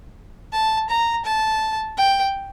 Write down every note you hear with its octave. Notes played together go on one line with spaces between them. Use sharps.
A5
A#5
A5
G5